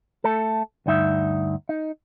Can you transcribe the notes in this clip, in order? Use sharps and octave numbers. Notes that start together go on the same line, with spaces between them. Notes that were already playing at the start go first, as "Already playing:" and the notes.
A3 A4
D2 G2 D#4 E5
D#4